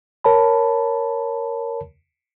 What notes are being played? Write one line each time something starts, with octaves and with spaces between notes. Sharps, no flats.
A#4 C#5 A5 B5